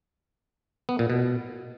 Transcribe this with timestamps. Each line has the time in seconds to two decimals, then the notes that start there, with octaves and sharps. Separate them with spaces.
0.89 B3
0.99 A#2
1.10 B2